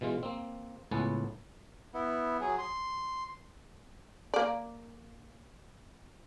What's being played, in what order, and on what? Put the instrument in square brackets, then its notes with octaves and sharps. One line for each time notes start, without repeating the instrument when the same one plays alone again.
[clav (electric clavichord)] B2 E3 G#3 F4
A#3 C4
C#2 A2 B3 F#5 G#5 A5
[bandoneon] B3 E4
F#3 G#4
C6
[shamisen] A#3 D5